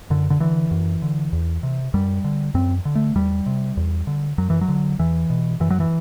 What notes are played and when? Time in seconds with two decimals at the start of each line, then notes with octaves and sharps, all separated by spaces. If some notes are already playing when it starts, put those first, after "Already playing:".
0.10 F#2 D3
0.30 D3
0.40 D3 E3
0.71 F#2
1.02 D3
1.33 E2
1.63 C3
1.94 F#2 G3
2.24 D3
2.54 F#2 C4
2.85 D3
2.95 A3
3.15 E2 G3
3.46 C3
3.77 E2
4.07 D3
4.38 F#2 F#3
4.50 E3
4.61 F#3
4.68 D3
4.99 E2 E3
5.30 B2
5.60 F#2 E3
5.70 F#3
5.80 E3